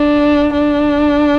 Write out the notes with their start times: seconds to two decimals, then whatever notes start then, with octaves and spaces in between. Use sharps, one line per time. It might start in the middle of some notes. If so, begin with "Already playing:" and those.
Already playing: D4
0.53 D4